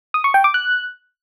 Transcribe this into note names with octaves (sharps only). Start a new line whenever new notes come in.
D#6
C#6
G5
D6
F#6